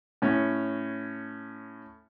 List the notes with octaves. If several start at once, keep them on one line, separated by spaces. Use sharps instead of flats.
A2 C#4